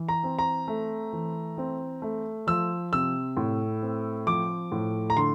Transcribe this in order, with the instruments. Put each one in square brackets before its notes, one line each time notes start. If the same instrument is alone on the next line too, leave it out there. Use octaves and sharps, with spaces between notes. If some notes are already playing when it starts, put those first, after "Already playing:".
Already playing: [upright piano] E3
A#5
C4
A#5
A3
E3
C4
A3
F3 E6
C3 E6
A2
C4
F3 D6
A2
A#5
D3 C6